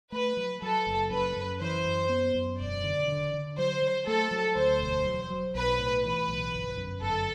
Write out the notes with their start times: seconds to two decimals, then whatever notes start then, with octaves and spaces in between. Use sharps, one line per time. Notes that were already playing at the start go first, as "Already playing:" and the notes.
0.12 A3 B4
0.37 F#3
0.62 F#3 A4
0.87 F#1
1.11 F#2 B4
1.36 F#2
1.61 E3 C5
1.85 F#2
2.09 B3
2.35 F#2
2.59 E1 D5
2.84 D3
3.08 D3
3.34 D3
3.58 F#3 C5
3.82 F#3
4.07 A3 A4
4.31 F#3
4.56 D2 C5
4.81 E1
5.05 F#3
5.30 F#3
5.55 B1 B4
5.79 A2
6.04 E3 B4
6.28 B1
6.54 G1
6.77 F#2
7.02 G1 A4